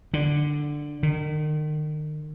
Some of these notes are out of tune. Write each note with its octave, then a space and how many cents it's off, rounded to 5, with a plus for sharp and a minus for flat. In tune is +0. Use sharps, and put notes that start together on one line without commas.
D3 +5
D#3 -35